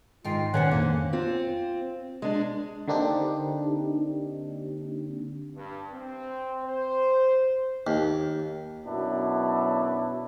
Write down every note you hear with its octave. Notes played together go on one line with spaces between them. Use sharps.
G#2 D#3 F4 G5 C7
A#2 D#3 C#4 A#4 C5 F#5
F2 D3 A#3
C4 F4
G#3 D4
D3 A#3 C4 D4 D#4 G4
G2
C4
C5
D#2
F#2 B2 F#3 D4 E4